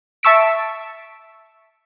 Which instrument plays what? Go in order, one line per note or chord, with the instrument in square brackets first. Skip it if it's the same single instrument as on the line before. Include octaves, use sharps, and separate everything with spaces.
[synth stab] E5 A5 C#6 E6 B6 D7